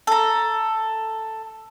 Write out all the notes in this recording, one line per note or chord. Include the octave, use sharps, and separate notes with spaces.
A4 A#5